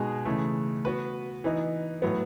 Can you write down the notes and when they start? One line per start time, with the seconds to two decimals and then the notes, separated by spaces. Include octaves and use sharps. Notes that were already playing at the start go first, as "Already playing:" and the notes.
Already playing: B2 G#3 D#4 G#4
0.25 C#3 E3 A3
0.85 B3 F#4 B4
1.44 E3 B3 D#4
2.02 A2 F#3 B3